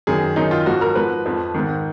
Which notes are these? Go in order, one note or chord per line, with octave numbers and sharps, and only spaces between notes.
F#2 D#3 G#4
F#2 D#3 D#4
F4
G#2 F3 F#4
A#4
G#2 F3 B4
F2 F3
G#2 D#3